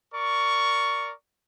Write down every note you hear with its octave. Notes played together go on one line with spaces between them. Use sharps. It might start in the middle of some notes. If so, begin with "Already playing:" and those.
A#4 D5 C#6